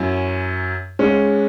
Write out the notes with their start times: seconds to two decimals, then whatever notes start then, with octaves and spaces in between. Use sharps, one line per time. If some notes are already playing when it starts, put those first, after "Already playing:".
Already playing: F#2 F#3 C#4 E4
0.99 G#2 G#3 C#4